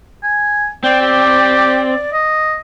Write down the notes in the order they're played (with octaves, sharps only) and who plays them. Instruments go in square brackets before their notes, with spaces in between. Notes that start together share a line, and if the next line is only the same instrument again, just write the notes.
[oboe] G#5
[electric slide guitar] C4 [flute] D5 [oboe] G5
[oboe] G4
D#5